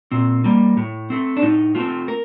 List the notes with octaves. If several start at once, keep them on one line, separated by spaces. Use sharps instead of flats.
A#2 C4
G3 A#3
A2
A3 C4
D4
A2 D#4
A3 C4 F4
A#4